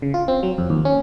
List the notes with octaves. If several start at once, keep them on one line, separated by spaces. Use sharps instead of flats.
C#3
F4
C4
F#3
F2
D#2
C#4